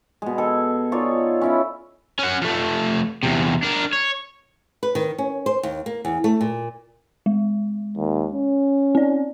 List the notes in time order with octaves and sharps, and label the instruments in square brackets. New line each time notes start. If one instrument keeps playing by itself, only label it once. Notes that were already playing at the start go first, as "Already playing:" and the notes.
[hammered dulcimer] B2 G#3
A4 G#5
D#4 F4 C#5 D5
C#4 E4 E5
[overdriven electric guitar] C#4 F#5
F3 A3
E2 C3
D4 A#4
C#5
[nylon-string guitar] B4
D#3
C#4
C5
D#2
A#3
E2
A3
A#2
[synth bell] G#3
[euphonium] D#2
C#4
[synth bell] C4 D5